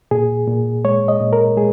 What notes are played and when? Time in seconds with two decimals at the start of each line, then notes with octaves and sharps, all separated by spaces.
0.11 A#2 G#4
0.48 A#2
0.84 G#3 C#5
1.08 D#5
1.21 A#2
1.33 A#4
1.57 G#3 G#4